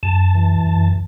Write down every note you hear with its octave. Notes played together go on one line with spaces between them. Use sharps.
F#2 A5
E3
F#2